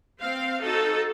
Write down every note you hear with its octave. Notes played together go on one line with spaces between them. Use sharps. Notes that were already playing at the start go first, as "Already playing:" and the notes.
C4 F5
D#4 F#4 A4